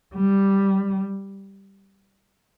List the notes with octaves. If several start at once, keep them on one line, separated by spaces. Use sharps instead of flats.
G3